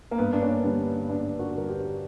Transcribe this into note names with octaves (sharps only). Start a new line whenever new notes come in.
A#3
G2 B3
D4
A#3 C#4
D3 G3 B3 D4
G2 B3 D4
F#4 A#4
D3 G3 A#4
G4 B4